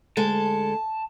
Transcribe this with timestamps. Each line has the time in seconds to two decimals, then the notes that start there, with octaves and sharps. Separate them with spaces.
0.17 D2 G#3 A4 A5